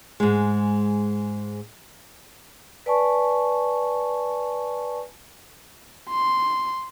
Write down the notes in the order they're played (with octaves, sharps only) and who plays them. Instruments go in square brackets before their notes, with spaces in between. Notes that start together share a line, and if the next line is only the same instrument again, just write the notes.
[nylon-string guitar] G#2 G#3
[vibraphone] B4 D5 G#5 A5 C#6
[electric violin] C6